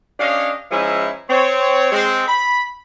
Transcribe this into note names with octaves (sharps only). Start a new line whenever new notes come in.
C#4 D4 G4 C#5 D#5 F5
F3 G#3 C#4 D#4 E4
C4 C#5
G#3 C4
B5